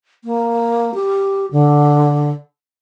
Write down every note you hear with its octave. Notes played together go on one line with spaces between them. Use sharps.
A#3
G4
D3